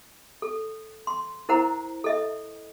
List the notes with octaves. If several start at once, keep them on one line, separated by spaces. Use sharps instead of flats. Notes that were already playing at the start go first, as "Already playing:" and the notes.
A4
C6
E4 A#4 C5 F#5 A#5
A4 D#5 E5